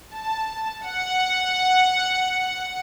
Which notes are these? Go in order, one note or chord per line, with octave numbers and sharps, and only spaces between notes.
A5
F#5